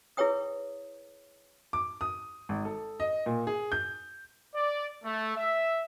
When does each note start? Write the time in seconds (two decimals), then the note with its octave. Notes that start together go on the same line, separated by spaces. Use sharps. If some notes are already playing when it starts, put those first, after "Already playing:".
0.17 E4 G#4 B4 C#5 G5 D#6
1.73 D6
2.01 D#6
2.49 G#1
2.65 A4
3.00 D#5
3.26 A#2
3.47 G#4
3.72 G6
4.54 D5
5.03 A3
5.35 E5